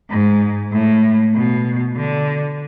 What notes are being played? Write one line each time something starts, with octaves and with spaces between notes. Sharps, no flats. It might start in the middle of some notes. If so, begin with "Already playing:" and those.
G#2
A2
B2
D3